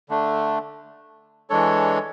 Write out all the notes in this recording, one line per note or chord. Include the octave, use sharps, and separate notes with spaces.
D3 A3 D4
E3 G#3 D4 A4 C#5